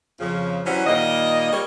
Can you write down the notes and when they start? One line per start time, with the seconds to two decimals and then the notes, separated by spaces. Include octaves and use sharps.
0.20 F2 C#3 F3
0.66 E3 F#3 G3 C#4 C5 F#5
0.87 A#2 D#3 G3 A#3 D#5
1.52 G3 A#3 C#5